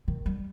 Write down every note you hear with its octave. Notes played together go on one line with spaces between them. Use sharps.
D#3
G3